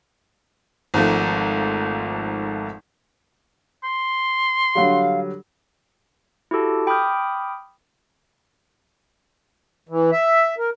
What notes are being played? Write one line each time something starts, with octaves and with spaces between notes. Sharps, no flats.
G#1 G#2 F3 A3
C6
D3 F#3 G3 F5
E4 F#4 G4 A4 A5
G5 B5 D6 D#6 F6 G6
E3
E5
A#4